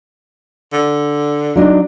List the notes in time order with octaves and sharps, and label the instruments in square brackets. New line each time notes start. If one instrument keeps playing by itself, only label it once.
[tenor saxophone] D3
[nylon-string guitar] F#3 D4 D#4